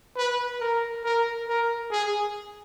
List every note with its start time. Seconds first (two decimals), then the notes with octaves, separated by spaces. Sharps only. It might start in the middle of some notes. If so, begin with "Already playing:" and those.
0.17 B4
0.60 A#4
1.04 A#4
1.48 A#4
1.91 G#4